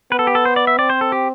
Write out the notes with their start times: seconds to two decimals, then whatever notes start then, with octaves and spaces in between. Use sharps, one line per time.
0.11 B3 B4
0.19 A4
0.27 G4
0.35 A4
0.45 C5
0.56 D5
0.67 E5
0.79 C4 D5
0.90 C5
1.01 A4
1.12 G4